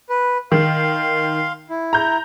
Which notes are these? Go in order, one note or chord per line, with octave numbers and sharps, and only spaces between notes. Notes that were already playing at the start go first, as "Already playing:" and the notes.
B4
D#3 F5 C6
E4
A#5 G6